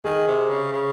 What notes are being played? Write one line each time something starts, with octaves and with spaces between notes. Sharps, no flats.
D#3 G#4
C3
C#3
C#3